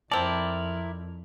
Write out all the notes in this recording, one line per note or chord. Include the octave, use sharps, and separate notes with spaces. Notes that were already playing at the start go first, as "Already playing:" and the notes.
F2 C4 E4 A#4 D5 A5